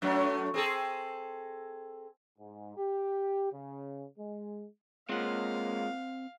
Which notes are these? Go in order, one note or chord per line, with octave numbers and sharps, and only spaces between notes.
F#2 F#3 A3
C4 G#4 A4
G#2
G4
C#3
G#3
G#3 A#3 C4 F4 F5 F#5